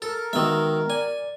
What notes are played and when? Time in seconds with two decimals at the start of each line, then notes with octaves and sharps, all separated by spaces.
0.02 A4 A#4
0.33 D#3 G#3 B3 F#4 E5
0.90 D5 G#5